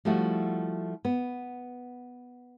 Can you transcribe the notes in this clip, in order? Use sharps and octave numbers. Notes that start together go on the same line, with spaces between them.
F3 G3 A3 E4 F#4
B3